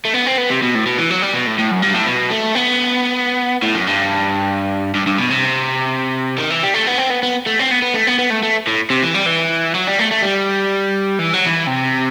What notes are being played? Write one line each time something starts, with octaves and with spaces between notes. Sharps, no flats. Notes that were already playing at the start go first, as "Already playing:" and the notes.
A3
B3
C4
B3
C3
B2
A2
B2
E3
F#3
G3
B2
A2
A2
F#2
G2
A2
B2
A3
B3
A2
F#2
G2
G2
G2
B2
C3
D#3
E3
G3
A3
B3
C4
B3
B3
A3
C4
B3
B3
A3
B3
B3
A3
A3
A2
C3
E3
G3
E3
F#3
G3
A3
A3
G3
E3
F#3
E3
C3